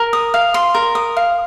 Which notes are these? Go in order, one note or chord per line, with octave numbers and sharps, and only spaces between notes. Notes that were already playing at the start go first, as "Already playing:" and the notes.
Already playing: A#4
D#6
F5
C6
A#4
D#6
F5